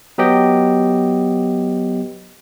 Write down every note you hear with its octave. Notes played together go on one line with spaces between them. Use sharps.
F#3 B3 G4 D#5 G5